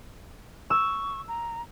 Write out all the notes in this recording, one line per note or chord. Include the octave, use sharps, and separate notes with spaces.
C#6 E6
A#5